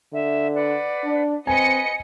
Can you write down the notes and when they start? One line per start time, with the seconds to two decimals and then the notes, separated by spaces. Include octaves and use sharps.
0.13 D3 E5
0.54 B4 D5 F#5
1.04 D4
1.47 C4 B4 D#5 G#5 C#7